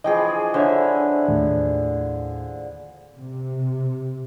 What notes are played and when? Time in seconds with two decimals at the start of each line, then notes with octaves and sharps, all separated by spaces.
0.04 E3 F3 G#4 D#5 G5
0.54 D3 C5 C#5 E5
1.28 D#2 A2
3.13 C3